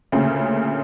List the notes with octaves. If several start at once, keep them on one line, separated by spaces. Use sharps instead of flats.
D2 A#2 C#3